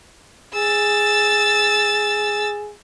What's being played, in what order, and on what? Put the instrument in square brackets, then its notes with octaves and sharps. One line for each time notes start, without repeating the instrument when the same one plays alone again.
[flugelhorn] G#4 [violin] E6 A6